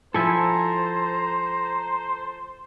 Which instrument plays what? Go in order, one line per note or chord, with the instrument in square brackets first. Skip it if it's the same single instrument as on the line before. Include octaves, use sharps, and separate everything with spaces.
[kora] F3 E4 [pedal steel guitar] A4 G#5 [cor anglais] C5 [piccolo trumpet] A#5